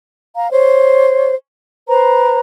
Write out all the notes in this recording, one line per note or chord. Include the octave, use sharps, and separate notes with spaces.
F5 A#5
C5 C#5
B4 C5 A#5